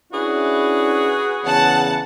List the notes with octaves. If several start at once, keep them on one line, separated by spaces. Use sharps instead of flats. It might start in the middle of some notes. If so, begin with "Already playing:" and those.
C#4 D4 E4 F#4 G#4 B4
E2 C#3 F#5 A5